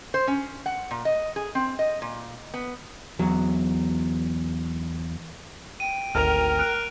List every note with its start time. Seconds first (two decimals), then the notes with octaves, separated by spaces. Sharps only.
0.14 C5
0.27 C#4
0.66 F#5
0.91 A#2
1.05 D#5
1.36 G#4
1.55 C4
1.79 D#5
2.02 A#2
2.54 B3
3.19 E2 F#3
5.80 G5 D#7
6.15 G#1 D2 A#4 F6 F7
6.59 F6 F#6 D7